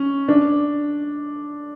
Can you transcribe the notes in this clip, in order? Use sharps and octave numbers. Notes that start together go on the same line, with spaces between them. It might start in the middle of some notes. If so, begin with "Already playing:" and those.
Already playing: C#4
D4